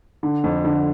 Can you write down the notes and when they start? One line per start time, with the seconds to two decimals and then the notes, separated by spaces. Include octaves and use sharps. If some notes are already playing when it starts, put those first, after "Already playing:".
0.23 D3
0.44 F2
0.65 D3